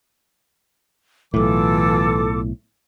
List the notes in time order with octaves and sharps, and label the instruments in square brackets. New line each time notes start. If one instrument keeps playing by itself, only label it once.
[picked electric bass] B1 A2 [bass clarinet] E3 [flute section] F4 A4 D6